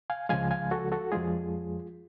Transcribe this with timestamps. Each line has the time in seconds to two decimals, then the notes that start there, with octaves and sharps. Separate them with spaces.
0.10 F5 G#5
0.29 C#2 C#3 F3 G#3 F5 G#5
0.51 F5 G#5
0.71 F#4 A4
0.92 F#4 A4
1.12 F2 F3 G#3 F4 G#4